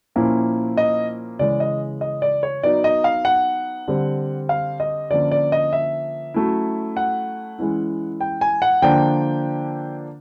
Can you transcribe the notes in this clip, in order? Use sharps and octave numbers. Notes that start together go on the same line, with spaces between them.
A#2 F3 A#3 C#4 E4
D#5
C#3 E3 G#3 D5
D#5
D#5
D5
C#5
F#3 B3 D#4 D5
D#5
F5
F#5
D3 G3 C4
F5
D#5
D3 F3 A#3 C#4 D5
D5
D#5
E5
F#3 A3 C#4 E4
F#5
E3 G#3 C#4 E4
G5
G#5
F#5
D3 F3 A#3 D4 G5